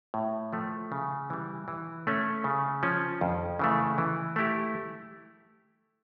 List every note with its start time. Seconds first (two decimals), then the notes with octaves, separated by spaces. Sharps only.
0.14 A2
0.53 F3 A3
0.92 C#3
1.30 E3 G3
1.68 E3
2.07 A3 C#4
2.44 C#3
2.83 F3 C#4
3.21 F2
3.59 C#3 E3 A3
3.98 E3
4.36 A3 E4 G4